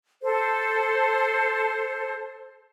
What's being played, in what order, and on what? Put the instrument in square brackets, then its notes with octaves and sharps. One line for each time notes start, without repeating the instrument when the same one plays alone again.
[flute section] A4 C5